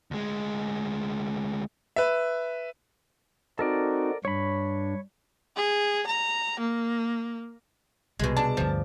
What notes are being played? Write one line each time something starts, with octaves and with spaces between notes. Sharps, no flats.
D2 G#3
B4 E5
C4 D#4 F#4 A4 A#4 D5
G2 D4 C#5 B5
G#4
A#5
A#3
C2 B2 G#3
D4 A5
D2 G2 F3